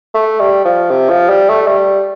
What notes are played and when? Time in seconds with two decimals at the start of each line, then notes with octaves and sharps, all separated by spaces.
0.14 A3
0.40 G3
0.65 F3
0.90 C3
1.10 F3
1.29 G3
1.49 A3
1.67 G3